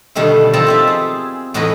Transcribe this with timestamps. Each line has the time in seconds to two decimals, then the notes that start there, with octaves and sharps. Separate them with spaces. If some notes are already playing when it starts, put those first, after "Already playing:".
0.15 B2 D3 D#3 G3 A3
0.53 D#3 F3 C4 A4 A5 A#5
0.67 F4 G4 E5
0.87 G#4
1.54 E2 A2 D#4 F#4 B4 D#5